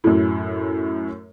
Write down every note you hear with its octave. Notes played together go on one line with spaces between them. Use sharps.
F#2 A2